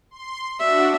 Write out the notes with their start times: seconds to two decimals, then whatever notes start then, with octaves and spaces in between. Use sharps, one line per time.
0.11 C6
0.59 D4 F#4 E5